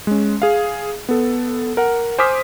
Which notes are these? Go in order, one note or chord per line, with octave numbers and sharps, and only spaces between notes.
G#3 C#4
G#4 F5
B3 A4
A#4 F#5
C5 G#5 D6 D#6 F6 B6